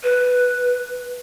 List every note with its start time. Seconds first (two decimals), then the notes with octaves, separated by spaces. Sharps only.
0.03 B4